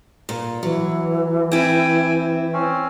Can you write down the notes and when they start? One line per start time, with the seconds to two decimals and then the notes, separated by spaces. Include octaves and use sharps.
0.29 A#2
0.63 E3 F#3
1.52 C4 E4 G5 G#5
2.53 C4 C#4